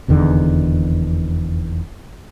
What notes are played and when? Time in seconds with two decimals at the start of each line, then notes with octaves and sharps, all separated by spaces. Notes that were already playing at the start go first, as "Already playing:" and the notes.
0.08 F1 E2 D3 D#3